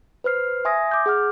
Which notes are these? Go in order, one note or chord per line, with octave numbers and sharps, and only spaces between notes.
B4 C5 F6 C7
E5 G#5 C6 D#6 G#6 A#6
D6 G6
G#4 F#5 D6 F6